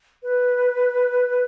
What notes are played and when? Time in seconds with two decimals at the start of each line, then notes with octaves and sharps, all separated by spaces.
0.23 B4